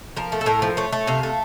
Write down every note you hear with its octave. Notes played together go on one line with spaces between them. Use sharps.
F3 A#4
A3
A4
A2 A#4
F3
A3 C#5
A3
C3 F5
A3